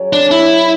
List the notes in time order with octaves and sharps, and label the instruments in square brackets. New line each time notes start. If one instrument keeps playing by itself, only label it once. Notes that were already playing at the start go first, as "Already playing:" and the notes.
Already playing: [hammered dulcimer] F#3 C#4 G#4 D5
[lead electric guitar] D4
E4